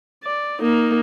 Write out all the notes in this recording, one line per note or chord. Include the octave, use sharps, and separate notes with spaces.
D5
A#3 D#4